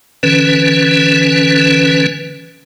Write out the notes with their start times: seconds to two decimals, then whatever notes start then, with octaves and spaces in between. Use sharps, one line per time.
0.23 D3 E3 C#4 B4